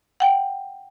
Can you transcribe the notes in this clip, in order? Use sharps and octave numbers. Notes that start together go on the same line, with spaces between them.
F#5 G5